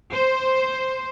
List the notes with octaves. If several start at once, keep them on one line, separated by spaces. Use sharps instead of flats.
C5